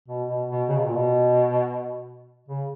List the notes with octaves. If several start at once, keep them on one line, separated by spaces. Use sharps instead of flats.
B2
B2
B2
C#3
B2
A#2
B2
C#3